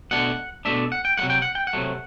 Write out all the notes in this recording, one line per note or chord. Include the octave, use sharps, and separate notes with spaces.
B2 A3 D4 F#5
B2 A3 D4 E5
F#5
G5
C3 F#3 A3 F#5
G5
F#5
G5
F#5
C3 F#3 A3